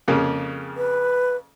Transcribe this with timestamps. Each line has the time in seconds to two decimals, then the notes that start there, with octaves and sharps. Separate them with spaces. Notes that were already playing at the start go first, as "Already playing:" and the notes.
0.08 F2 C#3 A#3
0.77 B4